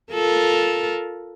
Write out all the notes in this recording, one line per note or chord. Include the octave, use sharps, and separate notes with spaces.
F4 A4 A#4